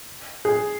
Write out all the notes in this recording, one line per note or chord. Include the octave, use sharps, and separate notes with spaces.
G#4